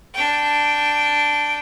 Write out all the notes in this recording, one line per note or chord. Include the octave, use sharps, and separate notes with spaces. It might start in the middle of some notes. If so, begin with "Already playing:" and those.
D4 G5